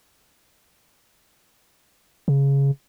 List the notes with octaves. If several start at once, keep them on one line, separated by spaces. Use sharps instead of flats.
C#3